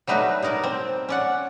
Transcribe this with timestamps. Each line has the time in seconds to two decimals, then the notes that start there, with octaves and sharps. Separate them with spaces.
0.07 F#3 G3 A3 D#4 B4
0.42 B2 D#4 A#4 D5
0.63 C4
1.09 C#4 D5 F#5